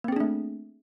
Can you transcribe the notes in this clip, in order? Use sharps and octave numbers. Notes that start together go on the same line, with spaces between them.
A3 A#3 C4 D4 G#4